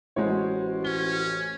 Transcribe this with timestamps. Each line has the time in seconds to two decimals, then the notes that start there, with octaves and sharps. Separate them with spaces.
0.16 A1 G#3 E4 F#4 C5 C#5
0.85 C#4 G7